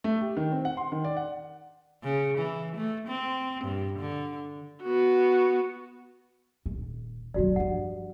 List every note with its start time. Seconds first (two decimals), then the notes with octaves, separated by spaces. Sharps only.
0.04 A3
0.21 G4
0.37 D#3
0.52 C4
0.65 F#5
0.77 C6
0.92 D#3
1.05 D5
1.17 F#5
2.04 C#3
2.39 E3
2.77 A3
3.08 C4
3.64 G2
3.99 D3
4.83 B3 F#4
6.66 D#1
7.34 F#2 F#3 F#4 D5
7.56 G2 F3 F#5